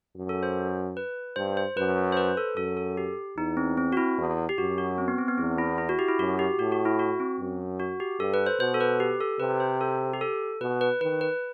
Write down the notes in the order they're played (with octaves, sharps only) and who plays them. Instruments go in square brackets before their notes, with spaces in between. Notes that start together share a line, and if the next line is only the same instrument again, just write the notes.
[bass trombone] F#2
[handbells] A4
C5
B4
[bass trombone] G2 [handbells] C5
[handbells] C5
[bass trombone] F#2 [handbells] B4
[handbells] C5
B4
A4
[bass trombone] F#2 [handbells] A4
[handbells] A4
G4
[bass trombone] E2 [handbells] D#4
[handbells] C4
C4
F#4
E4
[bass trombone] E2
[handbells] G4
[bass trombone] F#2 [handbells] F#4
[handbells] F#4
C4
B3
C4
B3
[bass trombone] E2 [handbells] C4
[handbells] E4
E4
F#4
G4
E4
[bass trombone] F#2 [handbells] F#4
[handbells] G4
[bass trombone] A2 [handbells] F#4
[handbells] F#4
E4
F#4
C4
[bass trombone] F#2
[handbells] F#4
G4
[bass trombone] G2 [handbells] A4
[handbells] B4
C5
[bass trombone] B2 [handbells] C5
[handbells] A4
B4
G4
A4
[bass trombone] C3 [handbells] B4
[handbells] C5
A4
G4
A4
[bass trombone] B2 [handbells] B4
[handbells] B4
[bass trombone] D#3 [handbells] B4
[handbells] B4